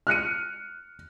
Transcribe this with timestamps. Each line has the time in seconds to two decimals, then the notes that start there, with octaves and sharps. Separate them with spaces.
0.07 F6 F#6 C#7 D#7